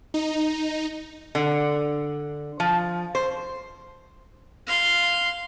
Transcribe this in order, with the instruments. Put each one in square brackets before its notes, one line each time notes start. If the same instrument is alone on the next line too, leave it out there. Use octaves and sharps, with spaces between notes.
[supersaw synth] D#4
[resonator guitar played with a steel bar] D3
F3
C5
[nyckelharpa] F5 C6